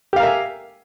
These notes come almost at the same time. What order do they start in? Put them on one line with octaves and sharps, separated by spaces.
G4 F5 A#4 E5 G#5